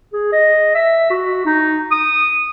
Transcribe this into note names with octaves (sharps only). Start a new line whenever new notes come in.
G#4
D#5
E5
F#4
D#4
D#6